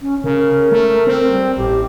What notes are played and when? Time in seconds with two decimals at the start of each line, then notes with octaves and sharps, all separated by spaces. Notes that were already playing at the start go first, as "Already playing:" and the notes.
0.02 C#4
0.24 C#3 A#4
0.72 A3
1.07 C4
1.29 G3
1.57 A1 G4